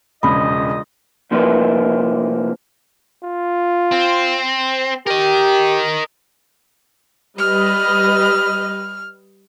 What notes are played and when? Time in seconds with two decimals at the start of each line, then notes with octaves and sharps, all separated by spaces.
0.23 E1 A#1 C#3 G3 F4 D#5 B5
1.31 C2 C3 F3 A#3 E4 B4
3.24 F4
3.92 C4
5.07 G4 A#4 D#5
7.38 G3 B4 D#5 F6